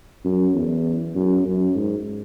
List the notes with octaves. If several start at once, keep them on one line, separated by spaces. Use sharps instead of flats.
F#2
E2
F#2
F#2
G#2